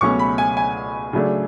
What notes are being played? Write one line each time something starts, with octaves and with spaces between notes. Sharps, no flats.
C#2 B2 F#3 A3 C#4 C#6
B5
G#5
G#5
C#3 F#3 A3 D4